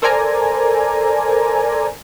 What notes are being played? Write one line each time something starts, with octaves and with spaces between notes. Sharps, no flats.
A4 A#4 C5 D5 G#5 A#5